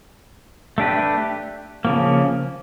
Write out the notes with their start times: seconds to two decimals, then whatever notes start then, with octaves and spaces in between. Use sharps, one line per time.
0.78 A3 D4 G4 B4
1.85 C#3 F3 A#3